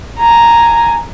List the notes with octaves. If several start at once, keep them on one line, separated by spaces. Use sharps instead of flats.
G#5 A#5